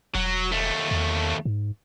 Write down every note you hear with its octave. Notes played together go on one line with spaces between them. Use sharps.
E1 F#3
D#2 A3
E2
G#2